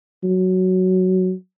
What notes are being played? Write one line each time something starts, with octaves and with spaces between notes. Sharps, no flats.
F#3